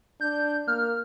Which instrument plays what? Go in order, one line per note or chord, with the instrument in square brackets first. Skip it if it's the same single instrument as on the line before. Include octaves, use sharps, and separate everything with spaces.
[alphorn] D4 [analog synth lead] G6
[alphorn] A#3 [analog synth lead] F6